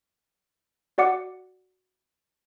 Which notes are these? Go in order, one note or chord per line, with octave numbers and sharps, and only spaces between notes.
F#4 D5 F#5 D6 C#7